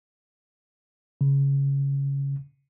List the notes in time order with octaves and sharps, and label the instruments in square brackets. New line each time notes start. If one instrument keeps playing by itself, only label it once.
[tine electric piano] C#3